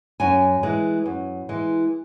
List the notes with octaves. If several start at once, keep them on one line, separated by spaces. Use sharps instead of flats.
F#2 G#5
E3 G#3
F#2
E3 G#3